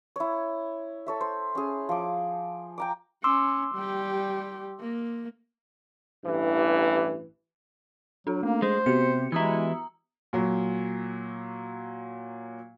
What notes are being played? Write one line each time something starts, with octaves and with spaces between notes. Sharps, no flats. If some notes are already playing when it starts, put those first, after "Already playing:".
E4 C#5
A4 C#5 E5
C5
C#4 G#4
F3 D6
G5 A#5 D6
C#4 C6 D6 E6
G3 G4
A#3
A1 G2 E3
F#3 D4 A4
A3 A#3
G#3 C5
C3 B3 F#4 G4 C#7
E3 G#3 E4 A#5 D#6 E6
A#2 F#3